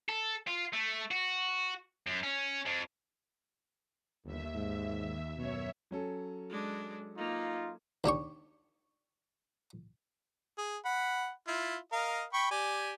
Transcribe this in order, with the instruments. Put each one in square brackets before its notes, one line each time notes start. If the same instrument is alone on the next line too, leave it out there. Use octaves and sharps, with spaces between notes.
[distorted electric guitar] A4
F4
A3
F#4
F#2
C#4
F2
[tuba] G1 [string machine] D#2 E5
[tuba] G#2
[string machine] F#2 C#5 E5 [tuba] B2
[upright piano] F#3 C#4 A4
[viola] G#3 D4
[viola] A#3 [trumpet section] D#4 F4
[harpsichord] D#2 D4 G4 C#6
[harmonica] G#4
F#5 B5
E4 F4
A#4 D#5 F5
G5 B5 C#6
G4 D5 G#5